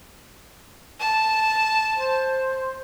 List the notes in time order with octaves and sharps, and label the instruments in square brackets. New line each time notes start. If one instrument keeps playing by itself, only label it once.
[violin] A5
[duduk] C5